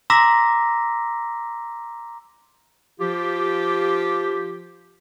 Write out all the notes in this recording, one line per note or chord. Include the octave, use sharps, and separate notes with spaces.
A#5 C6 D6 E6 A#6 B6
F3 F4 G4